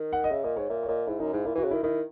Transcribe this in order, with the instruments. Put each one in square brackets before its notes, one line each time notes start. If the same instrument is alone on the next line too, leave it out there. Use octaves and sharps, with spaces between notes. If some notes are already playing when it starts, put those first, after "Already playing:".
Already playing: [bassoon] D#3
[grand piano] F#5
D#5
[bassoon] C#3 [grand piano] E5
[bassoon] A#2 [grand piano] D#5
[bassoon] G#2 [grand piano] C#5
[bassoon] A#2 [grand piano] E5
[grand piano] C#5
[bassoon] A#2 [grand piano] D#5
[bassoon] G#2 [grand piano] E4
[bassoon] F#2 [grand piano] D#4
[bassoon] G#2 [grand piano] E4
[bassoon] A#2 [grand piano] E4
[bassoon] E3 [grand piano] F#4
[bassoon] C#3
[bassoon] D#3 [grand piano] E4
[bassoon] D#3 [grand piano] E4